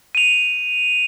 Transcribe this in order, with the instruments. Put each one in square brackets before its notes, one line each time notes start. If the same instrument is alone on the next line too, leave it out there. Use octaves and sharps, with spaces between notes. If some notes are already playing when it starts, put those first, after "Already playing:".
[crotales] D#7 F7